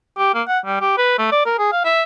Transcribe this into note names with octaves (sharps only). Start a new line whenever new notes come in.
G4
A#3
F#5
G3
G4
B4
A3
D5
A#4
G#4
F5
E5